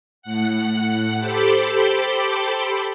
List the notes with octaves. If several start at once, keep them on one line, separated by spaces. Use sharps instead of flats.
A2 F#5
G4 A4 C5 B5 D6 G6